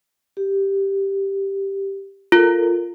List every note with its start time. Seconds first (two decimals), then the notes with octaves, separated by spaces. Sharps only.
0.37 G4
2.32 F4 A4 A#4